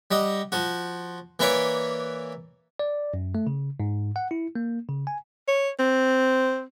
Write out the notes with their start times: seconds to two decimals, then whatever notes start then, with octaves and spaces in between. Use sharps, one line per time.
0.11 G3 D#5 F#5
0.52 F3 F#4
1.40 E3 A#3 E4 B4 C#5 D5
2.79 D5
3.14 F#2
3.35 A3
3.47 C#3
3.80 G#2
4.16 F#5
4.31 E4
4.55 A#3
4.89 C#3
5.07 G#5
5.48 C#5
5.79 C4